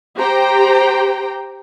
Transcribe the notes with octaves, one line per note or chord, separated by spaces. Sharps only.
G4 C5 G5 A#5